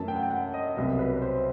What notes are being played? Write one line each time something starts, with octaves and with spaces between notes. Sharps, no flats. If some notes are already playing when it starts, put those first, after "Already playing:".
Already playing: F#2 E3 A3 A5
G5
F#5
G5
F#5
D#5
C2 B2 F#3 B3 E5
B4
C5